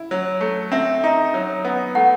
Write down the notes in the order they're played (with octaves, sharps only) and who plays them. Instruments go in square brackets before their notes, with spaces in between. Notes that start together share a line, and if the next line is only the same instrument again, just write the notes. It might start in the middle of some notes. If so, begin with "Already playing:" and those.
Already playing: [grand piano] E4
F#3
A3
[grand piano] C4 [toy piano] E5
[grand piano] D#4
F#3
B3
[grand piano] A3 [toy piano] F#5